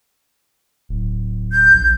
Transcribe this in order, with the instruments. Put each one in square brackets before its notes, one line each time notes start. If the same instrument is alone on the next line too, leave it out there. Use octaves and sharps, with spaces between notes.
[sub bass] D1
[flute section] G6
[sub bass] A#1